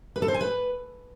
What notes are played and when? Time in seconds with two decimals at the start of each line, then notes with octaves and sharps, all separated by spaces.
0.16 B4
0.22 A4
0.28 C5
0.34 G#5
0.41 B4